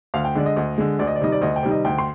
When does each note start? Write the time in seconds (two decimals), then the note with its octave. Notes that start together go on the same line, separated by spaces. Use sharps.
0.14 D2 F5
0.25 G5
0.35 D3 G#3 D5
0.46 D#5
0.57 D2
0.78 D3 G#3
0.99 D2 D5
1.07 D#5
1.16 D5
1.21 C3 D#3 G3 D#5
1.32 D5
1.41 D2 D#5
1.56 G5
1.63 C3 D#3 G3
1.71 D#5
1.85 D2 G5
1.98 C6